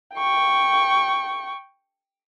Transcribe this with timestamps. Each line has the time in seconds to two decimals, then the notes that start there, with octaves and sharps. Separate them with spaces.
0.15 G5 C#6